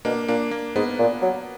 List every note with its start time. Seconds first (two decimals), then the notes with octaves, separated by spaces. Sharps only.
0.05 B2 A#3 D4
0.28 A#2 A#3 D4
0.51 A#3
0.76 G#2 B3
0.99 A#2
1.22 F#3